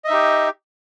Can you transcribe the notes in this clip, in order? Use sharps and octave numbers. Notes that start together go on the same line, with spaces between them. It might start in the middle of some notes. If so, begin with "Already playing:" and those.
D#4 G4 D#5 E5